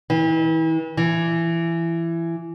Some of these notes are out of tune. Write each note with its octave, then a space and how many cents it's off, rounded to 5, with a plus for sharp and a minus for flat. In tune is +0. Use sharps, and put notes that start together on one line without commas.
E3 -35
E3 +20